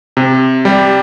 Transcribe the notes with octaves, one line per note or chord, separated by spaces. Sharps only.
C3
G3